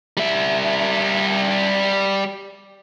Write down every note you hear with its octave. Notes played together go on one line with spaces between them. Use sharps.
G3 E5